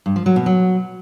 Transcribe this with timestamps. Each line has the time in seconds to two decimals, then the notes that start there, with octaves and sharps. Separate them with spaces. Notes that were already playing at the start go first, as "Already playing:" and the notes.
0.06 G2
0.16 F3
0.26 F#3
0.36 B2
0.46 F#3